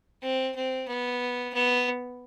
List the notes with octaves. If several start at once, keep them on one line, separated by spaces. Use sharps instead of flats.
C4
C4
B3
B3